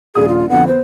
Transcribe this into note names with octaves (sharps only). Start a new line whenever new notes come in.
D#1 A#1 G#4 D#6
F4
F2 D3 B3 F#5
B3 C5